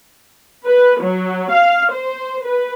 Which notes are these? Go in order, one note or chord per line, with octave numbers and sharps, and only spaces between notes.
B4
F#3
F5
C5
B4